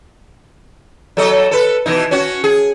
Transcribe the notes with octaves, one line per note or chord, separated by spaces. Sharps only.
F#3 A4 D#5
A4 B4
B2 E3 D#4
C#4 F#4
G#4